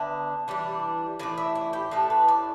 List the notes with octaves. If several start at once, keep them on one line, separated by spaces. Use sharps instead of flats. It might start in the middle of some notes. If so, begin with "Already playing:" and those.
Already playing: D3 B3 D4 E5
E3 G3 D4
A2 E3 D4 D5
E5
E4
G4
A2 A3 D4 A4
B4
D5